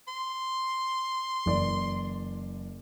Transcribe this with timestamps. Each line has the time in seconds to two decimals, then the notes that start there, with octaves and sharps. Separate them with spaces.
0.08 C6
1.46 F#1 E3 D5